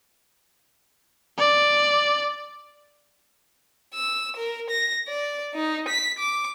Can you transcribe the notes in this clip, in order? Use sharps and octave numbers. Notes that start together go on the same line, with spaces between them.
D5
E6
A#4
A#6
D5
D#4
B6
D6